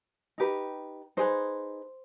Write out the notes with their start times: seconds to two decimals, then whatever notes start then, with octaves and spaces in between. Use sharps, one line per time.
0.38 D#4 G4 B4
1.17 D#4 G#4 B4 C5